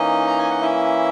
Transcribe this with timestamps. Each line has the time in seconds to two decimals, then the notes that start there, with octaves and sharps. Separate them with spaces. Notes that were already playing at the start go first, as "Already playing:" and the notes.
Already playing: E3 A#3 C#4 D#4 D#5
0.27 A#5
0.39 G#5
0.50 F#5
0.61 E4 E5